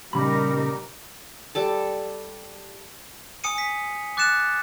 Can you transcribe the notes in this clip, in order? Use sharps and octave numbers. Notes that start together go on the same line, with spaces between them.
A#2 C#3 G3 D#4 A#4 B5
G3 A4 A5
G#5 D#6 C#7 D#7
B6
D6 F#6 A6 C#7 E7